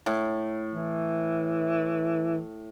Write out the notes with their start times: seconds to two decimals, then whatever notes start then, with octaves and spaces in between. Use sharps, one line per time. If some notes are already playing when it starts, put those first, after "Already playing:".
0.06 A2
0.74 E3